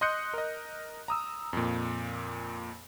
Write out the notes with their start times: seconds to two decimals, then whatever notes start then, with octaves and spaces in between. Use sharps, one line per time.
0.01 D#5 C6 D#6 F#6 G6 C#7
0.34 A#4 D#5
1.08 A#5 D#6 E6
1.53 F2 A#2